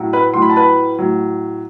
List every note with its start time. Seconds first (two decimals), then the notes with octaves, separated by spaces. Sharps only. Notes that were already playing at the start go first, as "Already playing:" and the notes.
Already playing: A2 F#3
0.13 B4 B5
0.34 A2 F#3 C6
0.42 B5
0.50 A5
0.56 B4 B5
0.98 A2 F#3